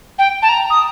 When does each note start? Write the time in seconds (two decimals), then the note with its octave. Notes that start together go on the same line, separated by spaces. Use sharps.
0.19 G5
0.42 A5
0.49 A#5
0.70 D#6